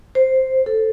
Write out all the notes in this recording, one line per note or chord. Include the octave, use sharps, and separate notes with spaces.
C5
A4